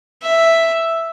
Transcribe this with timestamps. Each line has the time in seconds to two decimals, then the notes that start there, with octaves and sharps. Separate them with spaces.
0.23 E5